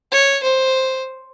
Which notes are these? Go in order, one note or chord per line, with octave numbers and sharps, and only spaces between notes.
C#5
C5